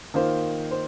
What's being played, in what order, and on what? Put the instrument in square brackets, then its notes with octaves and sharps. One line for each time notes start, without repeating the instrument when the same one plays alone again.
[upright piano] D#3 A#3 F4 C5
C5